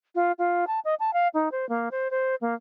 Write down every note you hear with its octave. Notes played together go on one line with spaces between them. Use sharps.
F4
F4
A5
D#5
A5
F5
D#4
C5
A#3
C5
C5
A#3